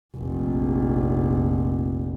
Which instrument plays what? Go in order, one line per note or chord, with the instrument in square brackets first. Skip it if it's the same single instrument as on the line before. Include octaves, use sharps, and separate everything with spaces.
[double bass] F1 A#1